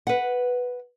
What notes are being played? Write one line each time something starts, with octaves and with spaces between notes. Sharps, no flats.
B4 F#5